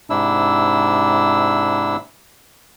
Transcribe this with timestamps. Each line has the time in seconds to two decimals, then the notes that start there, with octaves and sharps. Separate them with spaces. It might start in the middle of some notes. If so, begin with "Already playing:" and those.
0.10 G#2 C3 D4 E4 E6